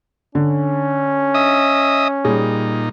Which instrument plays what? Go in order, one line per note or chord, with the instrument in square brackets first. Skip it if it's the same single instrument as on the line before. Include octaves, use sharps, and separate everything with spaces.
[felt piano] D3 [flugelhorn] C#4
[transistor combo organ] D#5 E5 D#6
[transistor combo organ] A#2 D#4 [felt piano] G3 G#4